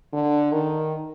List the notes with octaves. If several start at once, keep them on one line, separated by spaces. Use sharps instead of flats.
D3
D#3